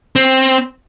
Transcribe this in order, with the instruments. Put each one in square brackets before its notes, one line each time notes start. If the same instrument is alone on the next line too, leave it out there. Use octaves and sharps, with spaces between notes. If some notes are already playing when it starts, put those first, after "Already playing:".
[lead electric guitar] C4